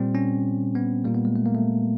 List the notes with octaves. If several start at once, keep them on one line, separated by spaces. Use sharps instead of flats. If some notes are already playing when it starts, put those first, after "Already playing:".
Already playing: A#2 G3 C4
C#4
B3
A#2 G3 A#3
B3
G#3
A3
A#3
A3